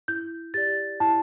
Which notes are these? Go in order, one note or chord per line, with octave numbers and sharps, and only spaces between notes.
E4 G6
G4 D5 A6
E4 A5